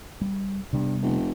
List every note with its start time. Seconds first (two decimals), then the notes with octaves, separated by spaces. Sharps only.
0.21 G3
0.73 G2 C3 G3 B3
1.02 F1